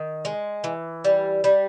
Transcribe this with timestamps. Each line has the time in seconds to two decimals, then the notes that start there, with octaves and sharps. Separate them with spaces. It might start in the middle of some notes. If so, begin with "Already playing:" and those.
Already playing: D#3
0.25 G#3
0.64 E3
1.04 G3
1.44 G3